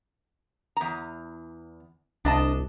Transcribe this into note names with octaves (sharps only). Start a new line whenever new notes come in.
E2 A#5
C2 D4 D#5 A5